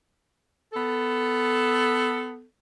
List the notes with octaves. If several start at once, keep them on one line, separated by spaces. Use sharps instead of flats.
B3 A4